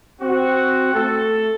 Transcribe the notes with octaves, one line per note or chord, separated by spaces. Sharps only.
C4 F#4
A3 A4